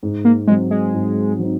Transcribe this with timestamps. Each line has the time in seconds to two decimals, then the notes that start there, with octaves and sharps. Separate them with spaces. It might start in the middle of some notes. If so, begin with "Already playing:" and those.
0.03 G#2
0.25 A#3
0.47 F#3 G#3 C4 D#4
0.71 G#3
0.94 G#2
1.39 F#3 C4 D#4